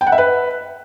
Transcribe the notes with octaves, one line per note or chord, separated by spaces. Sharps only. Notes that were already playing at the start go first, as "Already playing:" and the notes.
G5
F#5
E5
B4